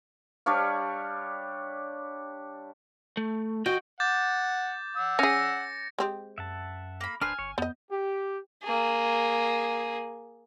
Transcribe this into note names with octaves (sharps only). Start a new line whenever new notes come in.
G3 D4 C#5 F5
A3
F#4 D#5 G5
F#5 D6 G6 A6
F#5 E6
C#4 G#4 A#6 C#7
G#3 C4 G4
F#2 E5 F#5 A5
A#3 B5
D1 D4 B4 C5 G#5 F6
G1 C#5
F2 B3 D#5 G6
G4
A#3 G#4